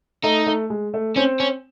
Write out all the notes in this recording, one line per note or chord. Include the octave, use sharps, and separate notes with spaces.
A3 D#4
A3
G#3
A3
C4 C#4
C#4